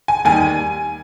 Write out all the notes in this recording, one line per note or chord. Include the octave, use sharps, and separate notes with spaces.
G#5
D#2 D#3 G3 G#5